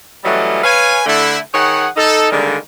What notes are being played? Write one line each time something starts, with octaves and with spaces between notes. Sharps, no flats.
E3 F#3 G3 A3 C#4 D#5
B4 C#5 F5 G#5
D3 A3 E4
D#3 G#4 C#5 F#5
D#4 A4
D3 D#3 G3 G#3 A#3